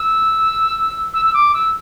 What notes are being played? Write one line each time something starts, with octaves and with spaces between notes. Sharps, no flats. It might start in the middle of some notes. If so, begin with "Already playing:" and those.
Already playing: E6
E6
E6
D6
E6